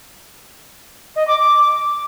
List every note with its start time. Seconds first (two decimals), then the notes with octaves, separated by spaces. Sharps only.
1.15 D#5
1.27 D6
1.39 D6